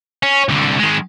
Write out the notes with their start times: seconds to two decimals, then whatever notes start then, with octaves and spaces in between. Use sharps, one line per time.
0.23 C#4
0.49 C2 D3
0.79 D#3 G#3